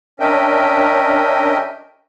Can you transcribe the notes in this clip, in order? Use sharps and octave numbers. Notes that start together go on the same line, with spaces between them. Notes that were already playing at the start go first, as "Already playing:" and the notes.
C#4 D4 A#4 D#5 E5 G5